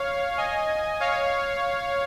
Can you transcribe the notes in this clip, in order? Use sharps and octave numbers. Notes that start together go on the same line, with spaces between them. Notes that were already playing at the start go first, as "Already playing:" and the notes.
Already playing: C#5 F5
D#5 G#5
C#5 F5